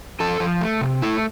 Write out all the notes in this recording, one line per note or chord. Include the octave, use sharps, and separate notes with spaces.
F3 A4
F3
A3
C3
A3 E4